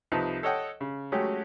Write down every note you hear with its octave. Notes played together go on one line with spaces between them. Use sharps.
C2 F3 D#4 B4 A5
A4 C#5 D#5 F#5 G5
C#3
F#3 G#3 A3 C#4 F#4 G4